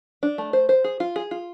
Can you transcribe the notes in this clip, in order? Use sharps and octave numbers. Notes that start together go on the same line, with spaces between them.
D4
A3
C5
C5
G#4
F4
G#4
F4